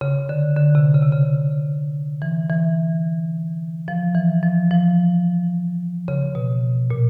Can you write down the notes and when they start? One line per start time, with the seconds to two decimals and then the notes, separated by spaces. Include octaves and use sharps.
0.01 C#3
0.29 D3
0.56 D3
0.75 C3
0.94 C#3
1.03 C3
1.12 C#3
2.22 E3
2.50 E3
3.88 F3
4.15 E3
4.43 F3
4.71 F3
6.08 C#3
6.35 B2
6.90 A#2